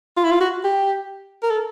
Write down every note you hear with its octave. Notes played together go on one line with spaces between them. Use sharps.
F4
E4
F4
F#4
G4
A#4
A4